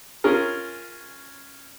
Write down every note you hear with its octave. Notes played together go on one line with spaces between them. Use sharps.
C#4 F4 G#4 A#4